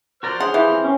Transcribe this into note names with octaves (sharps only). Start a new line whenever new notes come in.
F#4 A#4 C5 D5 F6
D4 G#4 C#5 F#5 C6
E3 G4 F5 G6
C4
C4 C#4 A#4 G5